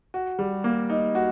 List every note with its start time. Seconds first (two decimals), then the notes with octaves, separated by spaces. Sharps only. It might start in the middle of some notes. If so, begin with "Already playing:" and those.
0.14 F#4
0.39 G3
0.64 A#3
0.90 D#4
1.15 F#4